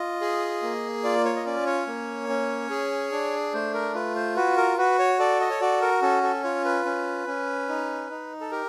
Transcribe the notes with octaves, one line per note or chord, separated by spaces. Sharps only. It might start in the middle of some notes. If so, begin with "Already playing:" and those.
Already playing: F4 D#5
G#4
A#3
F4 D5
C#5
D#5
C#4 D5
C#5
A#3
C#4
G#4
D4
A3 C5
A#4
F4 B4
C5
F#4 B4
A#4
F#4 B4
C#5
A4 D5
D#5
C#5
F#4 D5
A#4
C#4 A4
A4
F4 C#5
B4
C#4
C#4
D#4
D#4
A4
G4 A#4